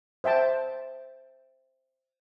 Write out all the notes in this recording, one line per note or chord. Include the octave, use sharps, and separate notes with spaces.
C5 E5 G5 A5